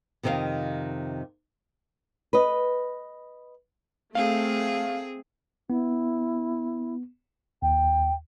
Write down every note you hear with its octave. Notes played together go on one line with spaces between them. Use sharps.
F2 C3 D#3 A4 D#5 F5
B4 D#5
A3 C4 G#4 F5
B3 E4
D#2 G5